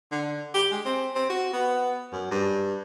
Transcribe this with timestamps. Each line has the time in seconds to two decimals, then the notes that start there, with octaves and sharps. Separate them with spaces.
0.11 D3
0.54 G4
0.71 G#3
0.85 C4
1.15 C4
1.30 F#4
1.53 B3
2.12 F#2
2.31 G2